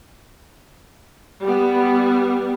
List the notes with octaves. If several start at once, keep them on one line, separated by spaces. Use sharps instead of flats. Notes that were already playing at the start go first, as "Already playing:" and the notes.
G3 B3